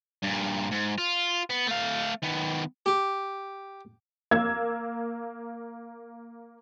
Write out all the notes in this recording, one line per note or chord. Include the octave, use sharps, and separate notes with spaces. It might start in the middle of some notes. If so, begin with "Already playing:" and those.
G2 A#2
G#2
F4
B3
A3 F5
D#3 B3
G4
A#3 E6 G#6